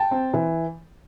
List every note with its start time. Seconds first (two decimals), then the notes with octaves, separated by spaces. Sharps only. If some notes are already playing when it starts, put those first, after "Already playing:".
Already playing: G5 A5
0.11 C4
0.34 E3